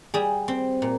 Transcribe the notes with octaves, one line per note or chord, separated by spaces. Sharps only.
G3 G#4
C4
A#2